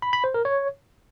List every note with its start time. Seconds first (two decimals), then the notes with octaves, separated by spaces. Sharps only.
0.02 B5
0.13 B5
0.24 C5
0.34 A#4
0.45 C#5